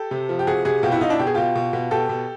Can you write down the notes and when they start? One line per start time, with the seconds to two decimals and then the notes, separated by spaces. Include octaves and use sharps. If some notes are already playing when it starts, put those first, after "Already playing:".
Already playing: G4 A4
0.11 C3
0.29 F3
0.39 G4
0.47 C3 F#4 G#4
0.65 C3 F#4 G#4
0.83 B2 F4 G4
0.92 E4 F#4
1.01 B2 D#4 F4
1.10 D4 E4
1.19 B2 G4
1.27 G#4
1.34 B2 F4 G4
1.55 B2
1.73 B2
1.91 B2 G4 A4
2.09 B2